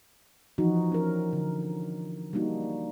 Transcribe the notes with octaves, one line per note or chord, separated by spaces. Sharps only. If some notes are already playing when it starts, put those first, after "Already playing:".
E3 F3 D#4 F#4
C#4 A#4
D3
G3 A#3 D4 D#4 F#4